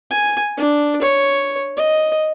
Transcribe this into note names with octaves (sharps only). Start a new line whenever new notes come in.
G#5
D4
C#5
D#5